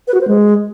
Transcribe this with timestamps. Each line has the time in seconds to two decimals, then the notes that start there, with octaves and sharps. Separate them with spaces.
0.08 B4
0.14 F#4
0.21 C5
0.28 G#3